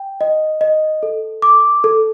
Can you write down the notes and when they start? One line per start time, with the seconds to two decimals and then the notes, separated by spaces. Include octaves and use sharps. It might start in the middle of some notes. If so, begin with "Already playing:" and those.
Already playing: G5
0.21 D#5
0.61 D#5
1.03 A4
1.42 D6
1.84 A4